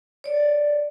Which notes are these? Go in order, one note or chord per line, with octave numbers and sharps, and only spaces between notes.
C#5 D5